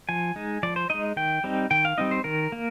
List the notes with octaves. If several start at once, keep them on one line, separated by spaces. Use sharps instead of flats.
F3 G#5
G#3 D#4
F3 D5
C5
G#3 D#4 D#5
D#3 G5
G3 C4 D#4
D#3 G5
F5
G3 C4 D#4 D#5
C5
D#3 A#4
A#3